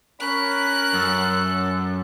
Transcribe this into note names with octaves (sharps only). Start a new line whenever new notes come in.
C#4 A#4 B5 F#6
F#2 A4